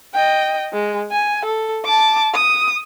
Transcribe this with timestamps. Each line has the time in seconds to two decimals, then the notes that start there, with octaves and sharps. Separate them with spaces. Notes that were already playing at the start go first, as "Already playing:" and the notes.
0.14 D#5 G5
0.73 G#3
1.11 G#5
1.45 A4
1.85 A5 D6
2.34 D#6